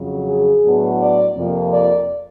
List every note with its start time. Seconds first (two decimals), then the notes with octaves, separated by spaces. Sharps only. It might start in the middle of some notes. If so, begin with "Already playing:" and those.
Already playing: F2 C#3 F#3
0.28 G#4
0.64 A2 F#3 B3 D4
1.00 D5
1.35 F2 C3 F3 A#3
1.72 D5